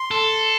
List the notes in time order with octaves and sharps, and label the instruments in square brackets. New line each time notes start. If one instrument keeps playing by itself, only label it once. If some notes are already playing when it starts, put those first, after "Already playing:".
Already playing: [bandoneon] C6
[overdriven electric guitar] A4